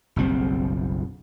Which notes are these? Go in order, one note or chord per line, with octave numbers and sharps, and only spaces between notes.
F#1 B1 G3 C4